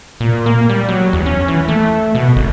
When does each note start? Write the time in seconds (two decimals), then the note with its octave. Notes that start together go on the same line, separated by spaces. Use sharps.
0.20 A#2
0.46 A#3
0.69 G3
0.89 F#3
1.13 E2
1.26 C#4
1.48 E3
1.68 A3
2.15 B2
2.36 G#1